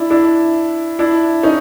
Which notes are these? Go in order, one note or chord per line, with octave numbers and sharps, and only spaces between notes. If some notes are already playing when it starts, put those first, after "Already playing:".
Already playing: D4 E4
D4 E4
D4 E4
C#4 D#4